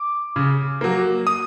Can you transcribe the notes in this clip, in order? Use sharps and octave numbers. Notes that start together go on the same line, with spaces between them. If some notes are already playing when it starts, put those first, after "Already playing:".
Already playing: D6
C#3
F#3 A#3
D#6